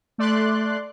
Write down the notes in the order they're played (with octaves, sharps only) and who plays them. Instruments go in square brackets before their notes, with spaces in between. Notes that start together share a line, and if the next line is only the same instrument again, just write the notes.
[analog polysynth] A3 D5 C6 F#6